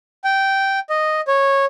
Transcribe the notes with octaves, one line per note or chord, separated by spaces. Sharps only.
G5
D#5
C#5